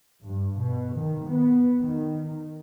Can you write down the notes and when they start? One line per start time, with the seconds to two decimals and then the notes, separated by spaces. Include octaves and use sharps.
0.25 G2
0.60 B2
0.96 D#3
1.28 B3
1.81 D#3